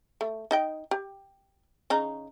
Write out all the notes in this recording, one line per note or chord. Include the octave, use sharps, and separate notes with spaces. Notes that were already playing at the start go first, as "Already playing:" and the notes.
A3
D#4 D#5 G5
G4
C#3 D#4 A#5